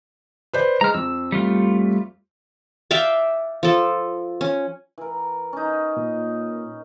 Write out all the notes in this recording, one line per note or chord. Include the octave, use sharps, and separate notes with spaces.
B4 C5 D5
G#3 A#5 F6
F2 E6
G3 A3 F4
D5 E5 F5 G5
F3 A4
C#4
E3 A#4
C#4 D#4
A#2